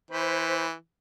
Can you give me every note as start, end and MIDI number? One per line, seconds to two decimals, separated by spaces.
0.11 0.73 52
0.11 0.66 72
0.11 0.66 83